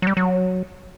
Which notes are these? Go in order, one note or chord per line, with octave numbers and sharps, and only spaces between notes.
F#3
G3
F#3